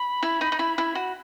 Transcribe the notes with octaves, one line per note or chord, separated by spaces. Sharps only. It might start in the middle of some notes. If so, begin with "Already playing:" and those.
Already playing: B5
E4
D#4
D#4
E4
E4
F#4